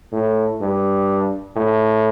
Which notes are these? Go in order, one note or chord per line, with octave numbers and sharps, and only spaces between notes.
A2
G2
A2